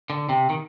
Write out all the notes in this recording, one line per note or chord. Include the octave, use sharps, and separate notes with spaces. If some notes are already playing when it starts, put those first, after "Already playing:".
D3
C3
D#3